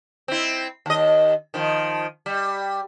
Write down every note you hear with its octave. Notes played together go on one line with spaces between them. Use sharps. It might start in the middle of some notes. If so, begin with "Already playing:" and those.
C4 E4
D#2 D#5
D#3 F3
G3